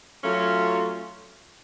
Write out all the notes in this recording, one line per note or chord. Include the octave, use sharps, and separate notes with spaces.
F#3 A3 C#4 F4